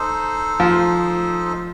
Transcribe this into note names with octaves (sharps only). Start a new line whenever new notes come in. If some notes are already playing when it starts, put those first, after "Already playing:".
Already playing: D#4 A4 C5
F3